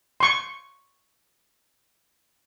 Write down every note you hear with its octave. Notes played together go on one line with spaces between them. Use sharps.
C6 C#6